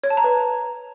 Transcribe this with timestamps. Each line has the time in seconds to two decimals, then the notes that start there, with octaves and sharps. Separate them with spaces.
0.04 C#5
0.10 A5
0.17 A#5
0.24 B4